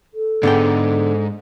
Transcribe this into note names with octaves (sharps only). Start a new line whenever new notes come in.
A4
G#2 D3 B3 G5